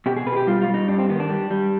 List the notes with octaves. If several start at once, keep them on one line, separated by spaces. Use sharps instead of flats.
B2 G4
G#4
B2 B4
G#4
G4
G3 F4
F4
G3
D#4
G2 D4
C4
D#3 B3
D4
G3
G3